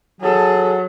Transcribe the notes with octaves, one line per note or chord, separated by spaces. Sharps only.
F#3 G#4 A4